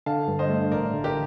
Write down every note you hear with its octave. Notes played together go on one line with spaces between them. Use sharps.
D3 F5 A5
G2
C5 D#5
A3
A1 A#4 D5
D3
G4 A#4